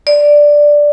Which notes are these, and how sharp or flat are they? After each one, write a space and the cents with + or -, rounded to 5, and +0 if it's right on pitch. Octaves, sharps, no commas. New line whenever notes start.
D5 +0